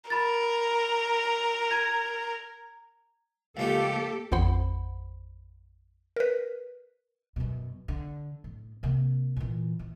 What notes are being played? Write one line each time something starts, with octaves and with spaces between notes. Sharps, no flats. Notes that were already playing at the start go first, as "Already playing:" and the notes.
A#4 B5 A6
A#5 G#6
C#2 F3 A3 A#3 G4 A4
A1 F2 C5 F#5 B5
A#4 B4
F#2 B2
D3
A2
C3 A#3
A#2 E3
E3